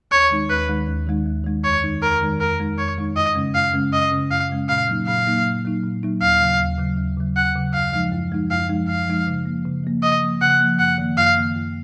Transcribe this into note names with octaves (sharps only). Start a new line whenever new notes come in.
D#2 C#5
D#3 G#3 D#4
D#2 B4
D#3 G#3 D#4
D#2
D#3 G#3 D#4
D#2
D#3 G#3 D#4
F2 C#5
D#3 G#3 D#4
F2 A#4
D#3 G#3 D#4
F2 A#4
D#3 G#3 D#4
F2 C#5
D#3 G#3 D#4
F#2 D#5
C#3 G#3 C#4
F#2 F5
C#3 G#3 C#4
F#2 D#5
C#3 G#3 C#4
F#2 F5
C#3 G#3 C#4
A#2 F5
F#3 A#3 D#4
A#2 F5
F#3 A#3 D#4
A#2
F#3 A#3 D#4
A#2
F#3 A#3 D#4
D#2 F5
C#3 F#3
D#2
C#3 F#3
D#2
C#3 F#3
D#2 F#5
C#3 F#3
F#2 F5
F3 G#3 D#4
F#2
F3 G#3 D#4
F#2 F5
F3 G#3 D#4
F#2 F5
F3 G#3 D#4
C#3
F3 A#3
C#3
F3 A#3
C#3 D#5
F3 A#3
C#3 F#5
F3 A#3
F#2 F#5
D#3 A#3
F#2 F5
D#3 A#3
F#2